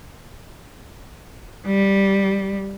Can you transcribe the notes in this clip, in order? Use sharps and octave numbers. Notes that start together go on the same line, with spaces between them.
G3